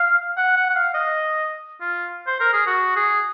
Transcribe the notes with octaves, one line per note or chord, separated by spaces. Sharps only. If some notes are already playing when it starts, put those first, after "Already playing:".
Already playing: F5
F#5
F#5
F#5
F5
D#5
F4
C5
A#4
G#4
F#4
G#4